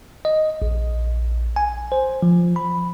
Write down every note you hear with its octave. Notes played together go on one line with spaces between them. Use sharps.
D#5
A#1
G#5
C5
F3
B5